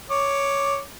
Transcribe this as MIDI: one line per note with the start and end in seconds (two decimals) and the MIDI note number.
0.11 0.80 73
0.11 0.80 86